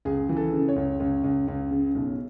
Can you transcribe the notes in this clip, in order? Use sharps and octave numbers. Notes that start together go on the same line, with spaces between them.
C#2 G#4
E3
A4
C#3
C#5
C#2
C#2
C#2
C#2
C#3
B1